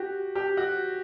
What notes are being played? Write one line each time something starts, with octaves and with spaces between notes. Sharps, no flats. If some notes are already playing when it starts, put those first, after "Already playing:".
Already playing: F#4 G4
G4
F#4